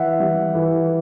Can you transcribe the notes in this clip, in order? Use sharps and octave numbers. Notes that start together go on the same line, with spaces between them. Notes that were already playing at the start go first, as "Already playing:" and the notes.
Already playing: E3 E5 F#5
G3
E3